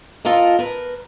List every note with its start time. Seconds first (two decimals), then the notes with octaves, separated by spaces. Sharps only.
0.25 F4 A4 A#4 D#5
0.59 A#4 B4